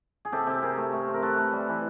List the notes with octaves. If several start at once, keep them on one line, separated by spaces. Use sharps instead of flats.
G#4
C3 G4 A4
C3 G4 A4
C3 G#4 A#4
A3
A3
C4
A#4
A3 A4 B4
A3
G3
E3